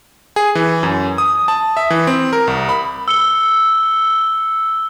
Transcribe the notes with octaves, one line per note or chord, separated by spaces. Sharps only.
G#4
E3
F#2
D#6
A5
E5
E3
C4
A#4
C2
B5
E6 C#7 G7